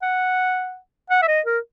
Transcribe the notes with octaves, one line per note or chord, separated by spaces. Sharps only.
F#5
F#5
E5
D#5
A#4